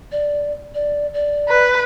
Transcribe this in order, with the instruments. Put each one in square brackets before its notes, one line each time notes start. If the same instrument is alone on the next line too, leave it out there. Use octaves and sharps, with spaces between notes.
[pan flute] D5
D5
D5
[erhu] B4